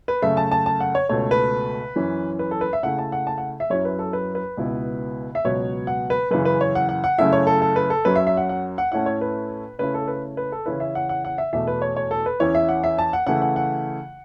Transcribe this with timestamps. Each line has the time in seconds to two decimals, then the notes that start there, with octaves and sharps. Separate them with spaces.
0.08 B4
0.22 F#2 C#3 A3 E5
0.37 A5
0.51 A5
0.66 A5
0.80 F#5
0.95 C#5
1.09 C#2 B2 A3 C#5
1.31 B4
1.96 F#2 E3 C#4
2.39 B4
2.51 A4
2.61 B4
2.73 E5
2.83 C#3 A3 E4 F#5
2.98 A5
3.12 F#5
3.27 A5
3.38 F#5
3.60 E5
3.70 F#2 F#3 C#4 E4 C#5
3.85 B4
3.99 A4
4.13 B4
4.35 B4
4.57 C#2 B2 B3 E4
5.35 E5
5.44 C#2 B2 F#3 B3 C#5
5.87 F#5
6.10 B4
6.31 F#2 C#3 E3 B4
6.45 B4
6.61 C#5
6.75 F#5
6.89 F#5
7.04 F#5
7.18 F#2 C#3 A3 E4 E5
7.33 C#5
7.47 A4
7.62 A4
7.76 B4
7.90 A4
8.05 F#2 F#3 C#4 B4
8.16 E5
8.27 E5
8.37 F#5
8.49 F#5
8.78 F#5
8.92 A2 A3 C#4 E4 F#5
9.06 C#5
9.21 B4
9.79 C#3 A3 C#4 E4 B4
9.94 A4
10.08 B4
10.37 B4
10.52 A4
10.66 C#3 E3 C#4 E4 B4
10.80 E5
10.95 F#5
11.09 F#5
11.25 F#5
11.38 E5
11.53 E2 B2 A3 E5
11.67 B4
11.82 C#5
11.96 C#5
12.11 A4
12.26 B4
12.40 E2 E3 C#4 E4 C#5
12.55 E5
12.69 F#5
12.84 E5
12.98 A5
13.13 F#5
13.27 C#3 E3 A3 E4 F#5
13.42 F#5
13.56 F#5